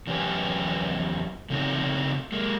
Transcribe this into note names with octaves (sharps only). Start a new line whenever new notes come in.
E2 F#3 C#4 G4 B4 G#5
C#3 A3 C4 D#4 F#4
G#3 A#3